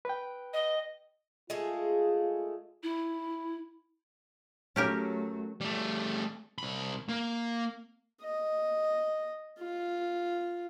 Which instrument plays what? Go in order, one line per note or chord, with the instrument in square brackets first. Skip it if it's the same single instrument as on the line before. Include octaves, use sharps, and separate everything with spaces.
[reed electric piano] B4 G5
[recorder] D#5
[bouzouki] G#3 A3 G#4 [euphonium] F4
[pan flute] E4
[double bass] F#3 A3 [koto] C#4 G4 A#4
[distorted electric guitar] G3 A3
C2 B5
A#3
[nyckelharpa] D#5
F4